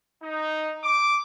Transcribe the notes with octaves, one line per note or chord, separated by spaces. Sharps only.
D#4
D6